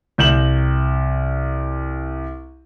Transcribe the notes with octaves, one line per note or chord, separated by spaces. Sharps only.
C2 G6 E7 F#7